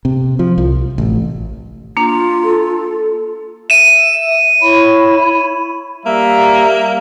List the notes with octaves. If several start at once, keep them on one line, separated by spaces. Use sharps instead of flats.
C3
F3
C2
A1
A#3 D4 F4
A4
E5 D#7 E7
E4 C#5 B5
G3 A#3 E5